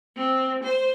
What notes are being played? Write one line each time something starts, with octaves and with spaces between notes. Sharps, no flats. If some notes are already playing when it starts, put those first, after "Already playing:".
C4
C5